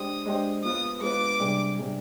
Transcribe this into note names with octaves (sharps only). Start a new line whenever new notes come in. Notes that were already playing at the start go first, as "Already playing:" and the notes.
Already playing: G#3 D4 G4 C5 D#6
G#3 D4 G4 C5
G#3 B3 F4 B4 D#6
G#3 B3 F4 B4 D6
C3 G3 D4 G#4
C3 G3 D4 G#4